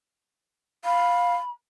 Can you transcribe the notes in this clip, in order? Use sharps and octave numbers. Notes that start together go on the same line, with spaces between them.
F5 B5